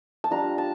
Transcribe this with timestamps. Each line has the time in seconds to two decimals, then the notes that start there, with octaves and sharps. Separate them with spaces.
0.24 A5
0.31 G3 D4 F4 A#5
0.58 A5